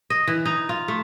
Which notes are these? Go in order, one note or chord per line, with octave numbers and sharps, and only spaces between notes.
D#5
E3
D#4
F4
A3